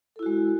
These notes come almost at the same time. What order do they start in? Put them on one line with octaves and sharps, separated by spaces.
A4 E4 F#4 G#3